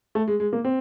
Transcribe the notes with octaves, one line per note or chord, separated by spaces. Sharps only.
A3
G#3
G#3
A#3
C4